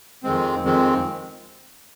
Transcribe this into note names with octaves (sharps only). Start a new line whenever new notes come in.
F2 D#3 G#3 C4
F2 D#3 G#3 C4